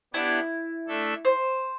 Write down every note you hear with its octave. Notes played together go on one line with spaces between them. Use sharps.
B3 D4 E4 G4 D5
A3 D4 A4 E5
C5